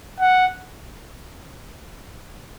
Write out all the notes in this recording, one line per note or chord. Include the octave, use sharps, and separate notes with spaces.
F#5